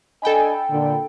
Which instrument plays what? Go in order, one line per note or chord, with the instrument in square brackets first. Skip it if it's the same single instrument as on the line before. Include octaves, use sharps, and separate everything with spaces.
[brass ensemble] D4 D#5 G#5 [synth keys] A4 G5 B5
[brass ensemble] A#2 D3